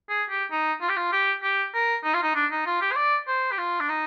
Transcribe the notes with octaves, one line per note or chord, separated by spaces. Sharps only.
G#4
G4
D#4
F4
G4
F4
G4
G4
A#4
D#4
F4
D#4
D4
D#4
F4
G4
C5
D5
C5
G4
F4
D4
D#4